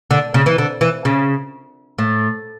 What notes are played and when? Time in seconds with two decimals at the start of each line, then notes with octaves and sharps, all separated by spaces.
0.11 D3
0.34 C#3
0.46 E3
0.58 D3
0.81 E3
1.05 C#3
1.99 A2